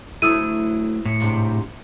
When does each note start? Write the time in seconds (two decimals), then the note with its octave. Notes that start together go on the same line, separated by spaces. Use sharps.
0.22 D2 F#3 A3 E4 D#6 E6 D#7
1.05 A2 C#7
1.20 G#2 C3 D4